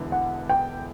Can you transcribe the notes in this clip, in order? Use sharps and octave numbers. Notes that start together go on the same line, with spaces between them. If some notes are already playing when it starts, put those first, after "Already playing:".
Already playing: E1 E2 D3
F#5
G5